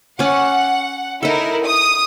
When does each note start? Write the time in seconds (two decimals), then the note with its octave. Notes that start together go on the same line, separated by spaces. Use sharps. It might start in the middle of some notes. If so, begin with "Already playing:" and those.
0.19 C#4 F#5 D6
1.23 D#4 E4 A4 A#4
1.64 D#6